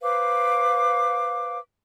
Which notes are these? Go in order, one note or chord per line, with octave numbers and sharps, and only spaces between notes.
B4 C5 F5 D6